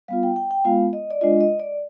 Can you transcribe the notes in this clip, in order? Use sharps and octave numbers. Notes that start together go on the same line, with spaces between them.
G3 B3 F4 F5
G5
G5
G5
G#3 B3 F4 F5
D#5
D5
G#3 D4 F4 D#5
D#5
D5